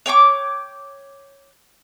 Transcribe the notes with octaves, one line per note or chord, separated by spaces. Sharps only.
C#5 G5 C#6 D6